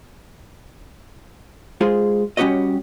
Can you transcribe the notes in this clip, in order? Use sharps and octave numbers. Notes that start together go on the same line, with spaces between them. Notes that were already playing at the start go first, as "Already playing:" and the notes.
G#3 F4 G#4 C5
G3 C#4 F#4 G4 C#5 D#5